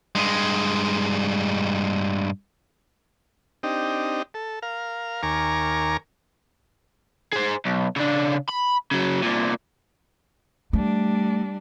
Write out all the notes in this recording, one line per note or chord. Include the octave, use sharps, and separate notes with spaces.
G2 G#3
C4 D4 D#4 G4 D#5
A4
A#4 F5
D#2 A#4 G#5 A#5 C#6 D6
G#4 C5
B1
C#3 D4
B5
C#3 F#3
C2 A#2
G3 A3 D4